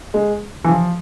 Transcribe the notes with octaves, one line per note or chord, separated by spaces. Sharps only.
G#3
E3
F3